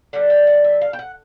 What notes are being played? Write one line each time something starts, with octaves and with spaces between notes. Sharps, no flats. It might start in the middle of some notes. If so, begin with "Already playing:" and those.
D3 G3 F#5
G5
F#5
E5
F5
G5
F#5